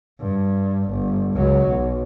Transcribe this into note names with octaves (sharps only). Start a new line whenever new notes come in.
G2
G1
C#2 F#3
B1